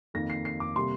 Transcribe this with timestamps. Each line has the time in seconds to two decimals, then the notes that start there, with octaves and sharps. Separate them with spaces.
0.14 F2 D#3 A#3 A#6
0.30 C7
0.45 C7
0.60 D6
0.76 C3 G3 A#3 C6